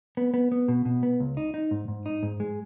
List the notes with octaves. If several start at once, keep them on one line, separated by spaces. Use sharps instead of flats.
B3
B3
B3
B2
B2
B3
C#2
D#4
D#4
G#2
G#2
D#4
G#2
G#3